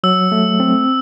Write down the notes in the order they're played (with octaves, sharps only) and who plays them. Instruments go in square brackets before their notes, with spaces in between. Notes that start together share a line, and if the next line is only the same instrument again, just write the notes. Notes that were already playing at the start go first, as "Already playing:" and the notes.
[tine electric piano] F#3 [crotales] E6
[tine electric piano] A3
C4